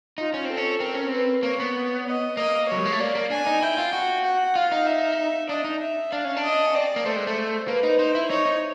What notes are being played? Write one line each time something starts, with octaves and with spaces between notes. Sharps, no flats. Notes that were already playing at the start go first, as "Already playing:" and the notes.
D#4 F4
C#4
C4 A4
C#4
C4 A#4
C#4
C4 B4
A#3 C#5
B3
D#5
A#3 D#5
F#3 C#5
G3
G#3
A3
A#3 D5
A#3
D4 G#5
D#4
E4 G5
F4
F#4
F#5
F4 F5
D#4
E5
D4 D#5
D#4
E5
D4 F5
C#4
D4
D#5
C#4
C4 D5
A#3
A3 C5
G#3
A3
A#3 B4
D#4
D#4 C5
E4
D#4 C#5
D#4